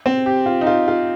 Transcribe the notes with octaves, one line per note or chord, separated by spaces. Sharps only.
C4
G4
F4
D#4
F4
F4